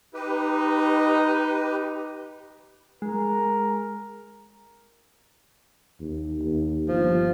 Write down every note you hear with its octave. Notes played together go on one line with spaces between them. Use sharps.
D#4 G4 B4
G#3 A#4
D#2
D#2
G1 F3